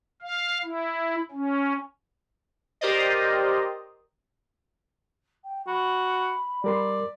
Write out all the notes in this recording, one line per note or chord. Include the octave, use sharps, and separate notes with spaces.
F5
E4
C#4
G4 A#4 C5 D5 D#5
G5
F#4 B5
G3 A#4 D5 C6